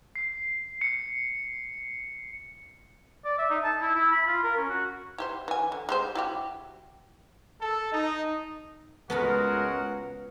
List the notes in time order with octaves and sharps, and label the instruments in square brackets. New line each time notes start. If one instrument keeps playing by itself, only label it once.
[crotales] C7
C#7
[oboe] D5
E5
D#4
A5
E4
E4
B5
F4
A#4
C#4
F#4
[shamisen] E4 G4 C5
E3 G#5
D3
G#3 G4 C5
E4 F#4 G4
[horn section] A4
D#4
[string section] C#2 [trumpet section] G#3 F#4 A#4 [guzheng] B3 A5 B5 [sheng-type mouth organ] F#5